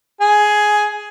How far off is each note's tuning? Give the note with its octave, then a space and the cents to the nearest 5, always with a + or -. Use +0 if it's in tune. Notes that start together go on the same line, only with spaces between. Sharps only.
G#4 +10